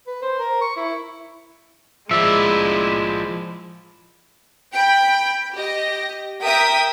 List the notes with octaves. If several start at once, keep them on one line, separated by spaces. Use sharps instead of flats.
B4
C5
A#4
C#6
E4
F3 G#3 E4 D5 E5
G5 B5
G4 D#5 A#6
A#4 E5 G5 D#6 B6